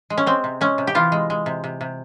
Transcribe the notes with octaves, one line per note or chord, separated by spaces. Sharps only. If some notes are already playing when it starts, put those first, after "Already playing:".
G#3
C#4
G#3 C4
C3
G#3 C#4
C3
G4
E3 F4
G#3
G#3
C3
C3
C3